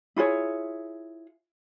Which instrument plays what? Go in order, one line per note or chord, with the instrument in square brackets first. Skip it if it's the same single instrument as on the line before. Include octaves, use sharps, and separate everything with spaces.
[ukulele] E4 F4 G#4 C#5